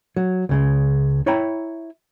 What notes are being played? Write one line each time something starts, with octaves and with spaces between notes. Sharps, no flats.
F#3
C#2 C#3 G#3
E4 C#5 E5 G5 A#5 B5